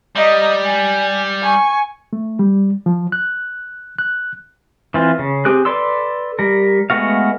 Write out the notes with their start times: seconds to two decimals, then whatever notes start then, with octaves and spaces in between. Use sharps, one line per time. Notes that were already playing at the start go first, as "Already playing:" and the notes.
0.16 G3 D#5 A#5
0.63 G#5
1.42 G#5 C#6
2.13 A3
2.39 G3
2.86 F3
3.12 F#6
3.99 F#6
4.94 E3 C4 F4
5.19 C#3
5.45 C4 G4 G#4 F#6
5.65 A4 B4 D5 C6 E6
6.39 G3 A#4
6.90 G#3 A3 B3 F#4 F5